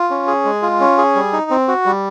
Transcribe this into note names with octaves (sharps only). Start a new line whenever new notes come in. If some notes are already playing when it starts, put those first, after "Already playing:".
Already playing: F4
C#4
G#4
G#3
F4
C#4
G#4
G3
D#4
C4
F#4
G3